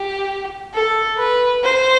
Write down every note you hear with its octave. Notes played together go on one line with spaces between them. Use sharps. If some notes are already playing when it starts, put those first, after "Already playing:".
Already playing: G4
A4
B4
C5